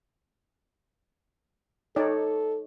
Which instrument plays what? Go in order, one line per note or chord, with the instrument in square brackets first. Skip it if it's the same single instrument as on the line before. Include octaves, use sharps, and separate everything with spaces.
[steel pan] D#4 C#5 D5 [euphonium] A4